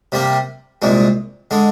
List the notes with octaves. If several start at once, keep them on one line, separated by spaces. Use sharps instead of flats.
C3 G3 A#3
C2 A#2 G#3
D3 G#3